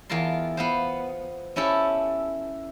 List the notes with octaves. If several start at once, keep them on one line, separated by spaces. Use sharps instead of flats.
E2 F4 A#4 A5 C6
B3 F4 C5
C#4 E4 G4 A4